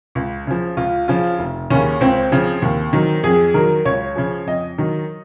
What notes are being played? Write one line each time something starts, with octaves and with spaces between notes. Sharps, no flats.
C#2
C#3 F3
C#2 F4
C#3 F3 F4
F1
D#2 C#3 C#4
C#2 C4
C#3 F3
D#2
D#3 F#3
F2 G#4
D#3 F#3 A#4
C#2 C#5
C#3 F3
F2 D#5
D#3 F#3